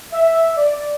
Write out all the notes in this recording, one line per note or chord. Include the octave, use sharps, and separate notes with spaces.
E5
D5